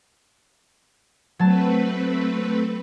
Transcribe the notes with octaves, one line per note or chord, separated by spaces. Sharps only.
F#3 A3 C4 B4 A5